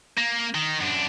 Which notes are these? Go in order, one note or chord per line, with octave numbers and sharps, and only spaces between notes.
A#3
D#3
F#2 D4